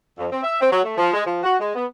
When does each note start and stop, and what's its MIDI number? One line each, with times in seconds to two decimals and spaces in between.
0.17 0.26 41
0.31 0.41 60
0.43 0.57 76
0.60 0.69 60
0.72 0.81 54
0.83 0.93 57
0.98 1.10 53
1.13 1.21 56
1.25 1.43 53
1.43 1.56 66
1.60 1.72 56
1.75 1.86 59